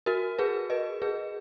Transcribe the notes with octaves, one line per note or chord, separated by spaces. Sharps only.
F#4 A#4
G#4 B4
B4 D#5
G#4 B4